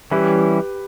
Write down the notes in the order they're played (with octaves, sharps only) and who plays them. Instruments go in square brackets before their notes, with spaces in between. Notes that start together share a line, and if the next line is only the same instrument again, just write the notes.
[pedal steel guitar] E3 G3 C#4 E4 [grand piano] G4 B4